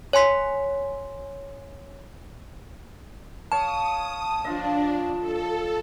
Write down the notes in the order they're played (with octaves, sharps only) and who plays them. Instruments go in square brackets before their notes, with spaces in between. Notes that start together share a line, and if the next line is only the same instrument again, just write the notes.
[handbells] C#5 G#5 C6 B6
[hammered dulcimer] C#5 F5 [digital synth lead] A5 [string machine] D#6
[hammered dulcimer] F3 F4 D#5 [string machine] D4
[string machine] A4